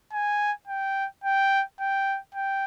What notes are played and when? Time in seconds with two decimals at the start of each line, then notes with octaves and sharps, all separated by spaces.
0.13 G#5
0.67 G5
1.24 G5
1.80 G5
2.34 G5